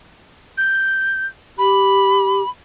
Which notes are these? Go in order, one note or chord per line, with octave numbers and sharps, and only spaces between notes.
G6
G4 B5